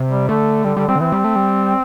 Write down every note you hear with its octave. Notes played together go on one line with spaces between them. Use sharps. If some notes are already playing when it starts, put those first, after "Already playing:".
Already playing: C3
G3
D3 A3
D3 G3
D3 G3
G3 C4
D3
E3 C4
G3
A3
G3